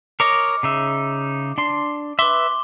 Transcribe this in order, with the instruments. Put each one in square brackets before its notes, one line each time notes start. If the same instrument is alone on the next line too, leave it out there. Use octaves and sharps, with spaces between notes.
[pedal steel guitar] A#4 C#5 D#5 [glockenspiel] D6
[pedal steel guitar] C#3 D#4 E5
D4 C6
[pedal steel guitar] B4 E5 [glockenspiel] C6 D6 G7